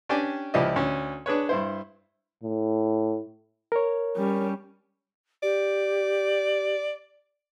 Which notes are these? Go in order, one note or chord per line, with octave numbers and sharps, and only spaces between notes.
C#4 D4 G4 D5 G5 G#5
C#2 F3 E4 G4 D5 D#5
D2 C#4
D4 G#4 B4 C#5
G2 E4 C5
A2
A#4 C#5
G3 C#4
G4 D5